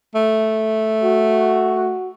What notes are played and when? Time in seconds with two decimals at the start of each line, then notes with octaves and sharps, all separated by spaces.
0.15 A3
1.03 F#4